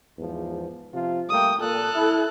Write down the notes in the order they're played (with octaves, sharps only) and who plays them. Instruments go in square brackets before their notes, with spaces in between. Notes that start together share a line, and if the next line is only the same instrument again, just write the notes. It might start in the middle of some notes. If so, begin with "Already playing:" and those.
[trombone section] E2 G#2 F3
C3 F3 F4
[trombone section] G3 A3 A#3 [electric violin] G5 D#6
[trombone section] A#2 [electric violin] A4 F#6
[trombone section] E4